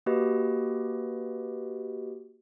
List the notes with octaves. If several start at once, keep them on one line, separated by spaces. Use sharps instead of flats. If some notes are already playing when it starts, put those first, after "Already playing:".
A#3 F#4 G4 B4 D#5